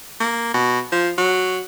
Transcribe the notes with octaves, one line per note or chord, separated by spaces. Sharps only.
A#3
B2
F3
F#3